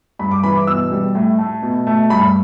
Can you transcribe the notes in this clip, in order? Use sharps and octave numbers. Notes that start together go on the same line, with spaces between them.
G2 B5
D6
E3 B5
D6
B2 E6
G3
A2
A3
B2
A3
G2 B5